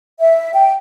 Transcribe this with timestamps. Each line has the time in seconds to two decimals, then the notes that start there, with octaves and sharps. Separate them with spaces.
0.20 E5
0.54 G5